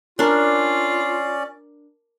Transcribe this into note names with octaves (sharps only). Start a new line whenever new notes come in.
C#4 D4 F4 A#4 D5